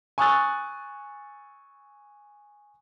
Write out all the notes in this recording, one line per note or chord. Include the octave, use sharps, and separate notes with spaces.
G#5 C#6 D#6 E6 F#6 A6